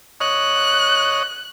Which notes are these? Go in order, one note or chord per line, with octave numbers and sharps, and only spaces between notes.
C#5 D#5 F#6